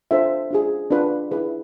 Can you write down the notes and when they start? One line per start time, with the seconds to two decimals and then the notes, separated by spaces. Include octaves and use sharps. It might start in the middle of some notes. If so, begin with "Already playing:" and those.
0.11 D4 F4 A4 C5 E5
0.51 D4 F4 G#4
0.91 D4 F4 B4
1.31 E4 G#4 B4